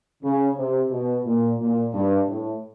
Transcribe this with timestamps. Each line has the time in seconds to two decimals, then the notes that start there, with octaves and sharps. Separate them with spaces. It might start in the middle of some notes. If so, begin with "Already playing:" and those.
0.23 C#3
0.56 C3
0.91 B2
1.25 A#2
1.60 A#2
1.93 G2
2.28 A2